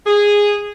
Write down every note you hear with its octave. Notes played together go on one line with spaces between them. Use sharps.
G#4